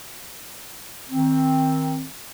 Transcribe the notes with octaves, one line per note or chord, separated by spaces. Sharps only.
D#3 C4